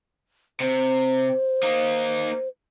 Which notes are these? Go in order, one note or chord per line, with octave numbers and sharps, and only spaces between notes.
C3 C5
A#3 D#4